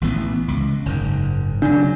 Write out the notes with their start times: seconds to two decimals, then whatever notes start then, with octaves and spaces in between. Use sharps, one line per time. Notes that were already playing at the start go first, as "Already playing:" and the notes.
0.01 A1 E3 B3
0.48 C#2
0.86 F#1 G#2
1.62 C#3 F#3 D4